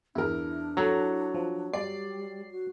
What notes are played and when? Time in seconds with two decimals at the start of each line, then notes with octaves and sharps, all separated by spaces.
0.15 E2 D4 E4 A#4
0.77 F#3 A4 A#5
1.34 F3
1.73 G3 D5 C7
2.51 F#4